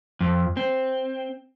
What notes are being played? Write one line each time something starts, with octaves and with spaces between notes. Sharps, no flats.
F2
C4